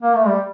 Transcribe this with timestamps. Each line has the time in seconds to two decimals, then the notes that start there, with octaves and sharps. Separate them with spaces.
0.02 A#3
0.15 A3
0.27 G3